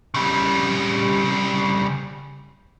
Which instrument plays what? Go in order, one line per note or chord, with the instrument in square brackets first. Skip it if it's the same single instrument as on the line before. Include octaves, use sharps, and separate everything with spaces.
[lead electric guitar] C#3 G3